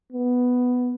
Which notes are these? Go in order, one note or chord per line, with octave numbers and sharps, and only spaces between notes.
B3